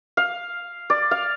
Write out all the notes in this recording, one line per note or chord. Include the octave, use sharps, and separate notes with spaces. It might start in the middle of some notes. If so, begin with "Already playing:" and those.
F5
D5
F5